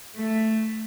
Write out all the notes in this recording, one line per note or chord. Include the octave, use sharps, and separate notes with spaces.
A3